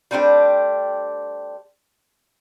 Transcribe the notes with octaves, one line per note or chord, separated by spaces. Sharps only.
G3 A3 C4 D4 G4